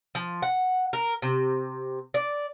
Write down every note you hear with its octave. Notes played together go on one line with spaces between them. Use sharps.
F3
F#5
A#4
C3
D5